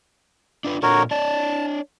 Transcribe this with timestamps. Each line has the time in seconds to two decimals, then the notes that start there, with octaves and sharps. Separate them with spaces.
0.65 D4 F4 B4
0.83 A#2 D4 F#4 A4 A#4 C#5
1.11 D4 C#5 D5 A5